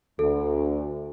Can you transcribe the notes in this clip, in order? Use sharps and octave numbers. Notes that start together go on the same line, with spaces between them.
D2 A4